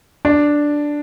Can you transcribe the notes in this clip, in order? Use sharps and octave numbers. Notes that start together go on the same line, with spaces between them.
D4